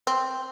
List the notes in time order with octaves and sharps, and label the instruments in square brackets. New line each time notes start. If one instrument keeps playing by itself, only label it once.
[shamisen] C4